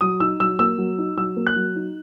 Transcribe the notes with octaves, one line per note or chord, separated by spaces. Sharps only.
F#3 D#6
D#4 E6
F#3 E6
A#3 E6
F#3
D#4
F#3 E6
A#3
F#6
F#3
D#4